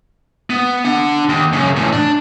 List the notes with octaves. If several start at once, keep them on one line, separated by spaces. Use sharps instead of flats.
B3
D4 F#5
D#2
F#2 C#3
E2 A2
D4